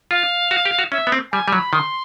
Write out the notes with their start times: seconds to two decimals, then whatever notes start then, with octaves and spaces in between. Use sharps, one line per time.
0.11 F4 F5
0.51 F#4
0.65 G4
0.79 F#4
0.92 C#4 E5
1.07 B3
1.12 C4
1.32 G3 G#5
1.48 G3
1.52 F#3 B5
1.72 D#3 C6